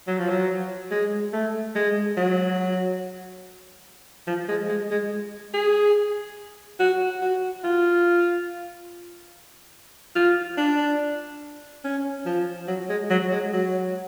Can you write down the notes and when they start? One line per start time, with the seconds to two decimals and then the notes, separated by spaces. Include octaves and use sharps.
0.07 F#3
0.18 F3
0.29 F#3
0.91 G#3
1.33 A3
1.76 G#3
2.17 F#3
4.27 F3
4.49 G#3
4.69 G#3
4.91 G#3
5.54 G#4
6.80 F#4
7.22 F#4
7.64 F4
10.16 F4
10.58 D4
11.85 C#4
12.26 F3
12.68 F#3
12.89 G#3
13.10 F#3
13.32 G#3
13.53 F#3